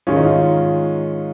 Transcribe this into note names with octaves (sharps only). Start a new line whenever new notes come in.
G#2 D#3 G#3 C#4 F4
D#4
F4